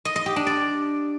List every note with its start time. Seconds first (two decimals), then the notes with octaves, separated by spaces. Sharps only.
0.05 D#5
0.16 D#5
0.26 G4
0.36 D4
0.47 D5